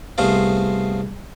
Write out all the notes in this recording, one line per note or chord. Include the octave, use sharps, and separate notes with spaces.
C2 A3 B3 G#4 C5 F5